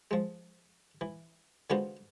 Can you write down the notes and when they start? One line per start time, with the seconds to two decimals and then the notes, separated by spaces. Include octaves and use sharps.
0.11 F3 G#3
1.01 E3
1.70 D3 G#3 B3 F4 F#4 C5